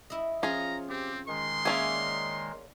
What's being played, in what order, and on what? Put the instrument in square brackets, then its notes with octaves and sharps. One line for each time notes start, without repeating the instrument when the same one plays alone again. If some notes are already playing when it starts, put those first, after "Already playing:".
[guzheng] E4 D#5
[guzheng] F3 C#4 [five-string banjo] F4 G#4 [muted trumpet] A#5
[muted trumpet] C4 [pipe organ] G4
[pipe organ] D#3 G#3 [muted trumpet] C6
[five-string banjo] A#3 C#4 G#4 [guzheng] D5 E5